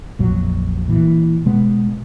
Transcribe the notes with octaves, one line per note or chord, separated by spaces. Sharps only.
A#1 F2 F#3
A#2 E3
B2 G#3 B3